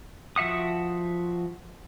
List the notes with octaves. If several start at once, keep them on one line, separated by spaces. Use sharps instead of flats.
F3 F#4 E5 F#5 D#6